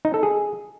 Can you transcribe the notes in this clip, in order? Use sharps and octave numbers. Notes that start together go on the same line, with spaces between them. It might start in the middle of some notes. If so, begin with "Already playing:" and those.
D#4
A4
G#4